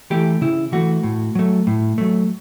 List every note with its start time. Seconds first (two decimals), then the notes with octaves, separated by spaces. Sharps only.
0.10 E3 A3 G4
0.41 C#3 E4
0.72 E3 A3 F#4
1.03 A2
1.35 F#3 A3
1.67 A2
1.98 F#3 A3